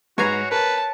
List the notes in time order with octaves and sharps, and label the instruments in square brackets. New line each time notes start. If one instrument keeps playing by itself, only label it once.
[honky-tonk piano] G#2 B4 C7 [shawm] F#4 [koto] C#5 G#5 A#5
[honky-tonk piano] A#4 [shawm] B4 [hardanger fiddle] A5